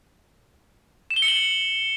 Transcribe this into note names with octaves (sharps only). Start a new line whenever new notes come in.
E7
G7
C#7
F#7